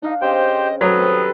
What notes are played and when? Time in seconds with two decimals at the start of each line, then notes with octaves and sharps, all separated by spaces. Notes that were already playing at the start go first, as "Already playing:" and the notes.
0.02 D4 D#4 F5
0.22 C#3 C4 G4 C5 D#5 G5
0.81 D#3 F#3 A4 B4 D#6
0.98 G3 C4